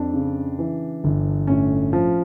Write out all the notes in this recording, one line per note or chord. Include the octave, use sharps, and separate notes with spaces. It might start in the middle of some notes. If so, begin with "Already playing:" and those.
Already playing: F2 D4
C#3
E3
G1
A2 C#4
F3